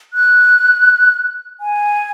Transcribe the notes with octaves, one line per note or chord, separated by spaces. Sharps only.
F#6
G#5